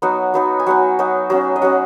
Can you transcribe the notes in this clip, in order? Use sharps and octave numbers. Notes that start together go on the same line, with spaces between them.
F#3 B3 D#4 F#5
F#3 B3 D#4
G#5
F#3 B3 D#4 F#5
F#3 B3 D#4
F#3 C#4
D#5
F#3 C#4 F#5